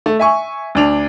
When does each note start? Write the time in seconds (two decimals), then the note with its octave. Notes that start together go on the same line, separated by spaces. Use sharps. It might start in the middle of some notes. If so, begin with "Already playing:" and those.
0.06 A3
0.19 E5 G#5 C#6
0.75 D2 D4 F7